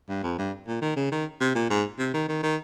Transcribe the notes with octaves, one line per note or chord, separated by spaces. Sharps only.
G2
F2
G2
A#2
D#3
C#3
D#3
C3
A#2
G#2
C3
D#3
D#3
D#3